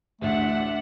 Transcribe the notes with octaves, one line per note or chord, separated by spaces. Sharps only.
A1 D2 A3 D4 E5 F#5